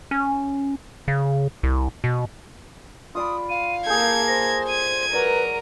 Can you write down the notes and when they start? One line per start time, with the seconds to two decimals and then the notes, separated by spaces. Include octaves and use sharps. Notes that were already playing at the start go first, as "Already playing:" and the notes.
0.11 C#4
1.08 C#3
1.63 C2
2.04 B2
3.15 F4 D5 B5 D#6
3.49 F5 D#7
3.86 A#3 G#4 A4 G6 G#6
4.27 C5 A#6
4.68 G#6 D#7
5.13 F#3 A#4 B4 D5